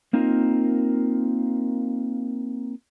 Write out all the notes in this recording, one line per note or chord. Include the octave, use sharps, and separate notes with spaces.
A#3 C4 D#4 F4 A#4